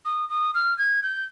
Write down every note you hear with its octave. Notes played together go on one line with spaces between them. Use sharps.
D#6
D#6
F6
G#6
G6